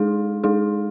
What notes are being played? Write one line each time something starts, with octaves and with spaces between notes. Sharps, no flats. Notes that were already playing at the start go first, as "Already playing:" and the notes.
Already playing: G#3 D#4 G#4
G#3 D#4 G#4